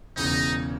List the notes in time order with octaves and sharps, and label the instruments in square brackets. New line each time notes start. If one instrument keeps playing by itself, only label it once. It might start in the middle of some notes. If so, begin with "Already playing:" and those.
[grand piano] E1 E2 C#3 [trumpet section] D#4